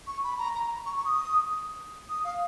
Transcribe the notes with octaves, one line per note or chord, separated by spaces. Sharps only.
C#6
B5
A#5
A#5
C#6
C#6
D#6
D#6
F5